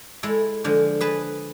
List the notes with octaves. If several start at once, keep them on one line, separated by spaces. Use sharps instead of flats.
G#3 E4 A4
D3 F3 G#3
G#4 B4 A5